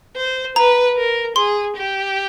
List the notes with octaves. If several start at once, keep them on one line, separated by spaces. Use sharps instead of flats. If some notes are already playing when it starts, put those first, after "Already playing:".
C5
B4 A#5
A#4
G#4 C6
G4